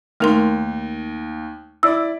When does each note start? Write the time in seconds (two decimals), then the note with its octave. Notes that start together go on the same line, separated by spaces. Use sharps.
0.20 D#2 A3 A#4 C6
1.83 E4 D5 E6